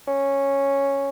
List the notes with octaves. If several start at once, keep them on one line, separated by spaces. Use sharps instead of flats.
C#4